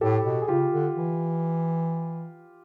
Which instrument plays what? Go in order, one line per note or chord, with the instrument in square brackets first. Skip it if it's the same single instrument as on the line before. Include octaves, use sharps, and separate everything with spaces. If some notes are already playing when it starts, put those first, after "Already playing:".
[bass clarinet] A2 [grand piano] G4 A4
[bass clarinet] B2
[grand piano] G#4
[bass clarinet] C#3 [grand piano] F4 G4
[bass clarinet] D3
E3